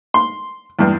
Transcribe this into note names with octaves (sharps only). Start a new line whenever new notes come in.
C6
E2 G2